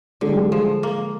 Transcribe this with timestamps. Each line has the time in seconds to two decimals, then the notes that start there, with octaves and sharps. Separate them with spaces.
0.21 D3 G#3
0.31 G3
0.39 G#3
0.52 F3
0.83 A#3